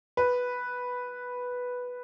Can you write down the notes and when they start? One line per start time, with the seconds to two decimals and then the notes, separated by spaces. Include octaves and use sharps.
0.17 B4